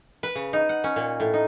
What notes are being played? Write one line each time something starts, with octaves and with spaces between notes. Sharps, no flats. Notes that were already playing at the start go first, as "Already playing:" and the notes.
B4
C#3
D#4
F#5
C#4
A#2
A2
D#4